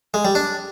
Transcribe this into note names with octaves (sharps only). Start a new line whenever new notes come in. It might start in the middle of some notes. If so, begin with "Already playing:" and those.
G#3
G3
D4